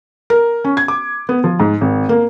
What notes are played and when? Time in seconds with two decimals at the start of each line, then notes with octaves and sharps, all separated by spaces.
0.30 A#4
0.64 C#4
0.77 G#6
0.88 D6
1.29 B3
1.44 F3
1.60 G#2
1.81 G#1
2.09 A#3